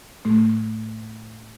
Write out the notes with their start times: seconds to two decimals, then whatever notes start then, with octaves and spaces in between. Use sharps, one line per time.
0.25 A2 A3